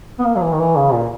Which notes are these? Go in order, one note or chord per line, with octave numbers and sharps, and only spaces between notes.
B3
A#3
F#3
E3
D#3
E3
C#3
A#2